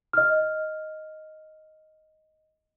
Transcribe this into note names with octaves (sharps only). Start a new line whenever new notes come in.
D#5 F6